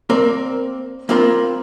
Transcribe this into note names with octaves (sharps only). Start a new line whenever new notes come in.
A#3 C4 A#4 D5
A#3 C4 F4 A#4 B5